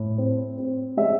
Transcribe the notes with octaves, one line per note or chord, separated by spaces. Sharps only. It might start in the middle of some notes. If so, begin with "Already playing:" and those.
Already playing: A2
C4
C4
G#3 E5